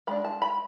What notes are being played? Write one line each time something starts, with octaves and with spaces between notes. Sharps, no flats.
G#3 D4 B5
A5
B5